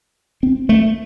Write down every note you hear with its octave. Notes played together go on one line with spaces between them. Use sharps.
C4
A3